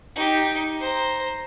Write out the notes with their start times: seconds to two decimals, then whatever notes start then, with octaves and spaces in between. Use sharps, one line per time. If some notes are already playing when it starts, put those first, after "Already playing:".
0.16 D#4 G4
0.79 C5 A#5